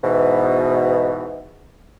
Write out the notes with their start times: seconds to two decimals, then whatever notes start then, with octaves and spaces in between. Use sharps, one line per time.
0.03 G#2 B2 E3